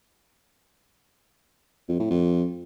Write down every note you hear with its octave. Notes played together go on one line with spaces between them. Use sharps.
F2
A2
F2